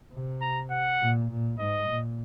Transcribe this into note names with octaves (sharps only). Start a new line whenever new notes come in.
C3
A#5
F#5
A#2
A#2
G#2 D#5
A#2